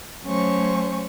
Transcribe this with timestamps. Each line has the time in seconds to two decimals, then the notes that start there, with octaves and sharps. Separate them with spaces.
0.25 F#3 A3 C#4 C5 C#6